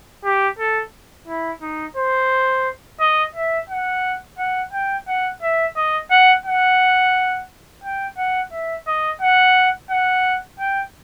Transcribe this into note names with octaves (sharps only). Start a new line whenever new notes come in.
G4
A4
E4
D#4
C5
D#5
E5
F#5
F#5
G5
F#5
E5
D#5
F#5
F#5
G5
F#5
E5
D#5
F#5
F#5
G5